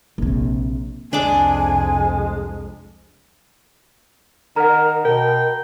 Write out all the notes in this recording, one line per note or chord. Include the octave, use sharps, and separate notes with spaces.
A#1 C3
C2 F2 G#3 D4 D5 G#5 D6
D#3 A#4 F#5 A#5
B2 A#4 G5